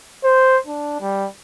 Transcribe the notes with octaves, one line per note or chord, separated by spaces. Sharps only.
C5
D4
G3